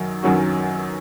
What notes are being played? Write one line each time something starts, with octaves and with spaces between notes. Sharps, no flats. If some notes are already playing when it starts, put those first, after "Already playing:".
Already playing: F#2 D#3 F#3
F#2 D#3 F#3 C#4 F#4